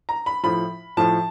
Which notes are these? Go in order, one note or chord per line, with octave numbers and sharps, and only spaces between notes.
A#5
B5
A2 F3 B5
A2 F3 A5